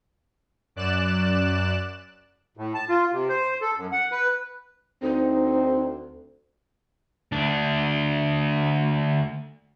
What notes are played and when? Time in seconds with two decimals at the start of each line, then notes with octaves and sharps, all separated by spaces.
0.76 F#2 D5 F#6 E7
2.57 A2
2.74 A5
2.89 F4
3.12 C3
3.29 C5
3.61 A4
3.77 F#2
3.92 F#5
4.12 B4
5.03 D2 C4 D#4
7.32 D2 D4